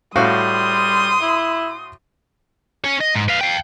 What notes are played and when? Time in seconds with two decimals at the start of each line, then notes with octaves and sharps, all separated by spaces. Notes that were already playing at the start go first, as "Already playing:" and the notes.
0.16 A2 G3 F#4 F5 C6 D#6
1.22 E4
2.84 C#4 C#5
3.01 D#5
3.15 G#2
3.29 B4 F5
3.41 F5 G5